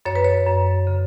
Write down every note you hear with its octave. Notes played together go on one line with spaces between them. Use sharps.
F#2 C#5
B4
C#5
F#2
C#3